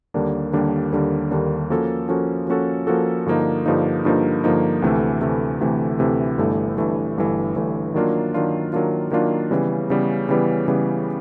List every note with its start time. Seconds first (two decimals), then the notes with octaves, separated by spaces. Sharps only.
0.14 D#2 D3 G3 A#3 D4
0.53 D#2 D3 G3 A#3 D4
0.92 D#2 D3 G3 A#3 D4
1.31 D#2 D3 G3 A#3 D4
1.70 F3 A#3 C#4 F#4 A4
2.09 F3 A#3 C#4 F#4 A4
2.48 F3 A#3 C#4 F#4 A4
2.87 F3 A#3 C#4 F#4 A4
3.26 G2 D3 F3 A#3 D#4
3.66 G2 D3 F3 A#3 D#4
4.05 G2 D3 F3 A#3 D#4
4.44 G2 D3 F3 A#3 D#4
4.82 D2 C3 E3 A3
5.21 D2 C3 E3 A3
5.60 D2 C3 E3 A3
5.99 D2 C3 E3 A3
6.38 G1 G2 E3 A3
6.78 G1 G2 E3 A3
7.17 G1 G2 E3 A3
7.56 G1 G2 E3 A3
7.94 D#3 F#3 A#3 D4 F4
8.34 D#3 F#3 A#3 D4 F4
8.73 D#3 F#3 A#3 D4 F4
9.11 D#3 F#3 A#3 D4 F4
9.51 C#3 E3 G3 B3
9.90 C#3 E3 G3 B3
10.29 C#3 E3 G3 B3
10.68 C#3 E3 G3 B3